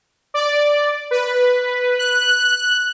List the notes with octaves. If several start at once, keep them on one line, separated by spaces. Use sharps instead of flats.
D5
B4
F#6